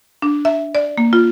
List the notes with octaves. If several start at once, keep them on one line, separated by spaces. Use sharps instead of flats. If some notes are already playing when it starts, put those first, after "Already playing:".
D4
E5
D5
A#3
F4